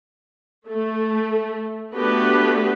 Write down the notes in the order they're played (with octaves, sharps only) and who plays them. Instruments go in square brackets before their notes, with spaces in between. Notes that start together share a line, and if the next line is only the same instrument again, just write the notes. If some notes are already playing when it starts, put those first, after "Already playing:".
[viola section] A3
A3 B3 D4 F#4 G4 B4